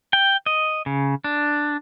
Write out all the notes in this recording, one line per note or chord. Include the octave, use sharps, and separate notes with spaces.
G5
D#5
C#3
D4